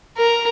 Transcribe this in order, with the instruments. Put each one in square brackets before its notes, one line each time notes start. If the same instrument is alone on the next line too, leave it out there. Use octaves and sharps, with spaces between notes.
[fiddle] A#4